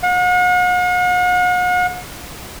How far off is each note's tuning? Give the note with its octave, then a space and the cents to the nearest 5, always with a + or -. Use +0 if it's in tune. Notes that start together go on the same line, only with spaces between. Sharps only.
F#5 -45